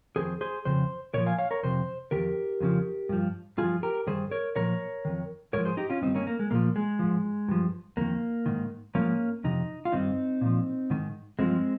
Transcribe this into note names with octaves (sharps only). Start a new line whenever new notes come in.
F2 D#3 G#4 C5
G#4 C5
F2 C#3 C5
A#2 F3 A#4 C#5
F5 G#5
C#5 F5
A#4 C#5
F2 C3 C5
F2 D#3 G4 A#4
F2 C#3 F3
G2 F3
G2 F3 F4 G#4
G4 A#4
G2 D#3 G#4 C5
A#4 C#5
A#2 F3 A#4 C#5
F2 D#3
G#2 F3 A#4 C#5
G#4 C5
D#4 G4
C#4 F4
G2 D#3 C4 D#4
A#3 C#4
A#3
G#3
A#2 F3 A#3
G#3
G#2 F3
G2 F3
F2 D#3 A#3
G#2 D#3
G#2 F3 A#3 C#4
F2 C3 D#4
F4
G2 D#3 C4 D#4
A#2 F3
G#2 D#3
G2 F3 G#3 C4